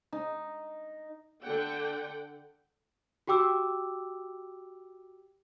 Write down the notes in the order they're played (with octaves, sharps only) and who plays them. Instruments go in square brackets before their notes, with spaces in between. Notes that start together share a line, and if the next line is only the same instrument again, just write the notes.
[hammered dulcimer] D#4
[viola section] D3 F#5 G5
[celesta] F#4 G4 G5 D6 E6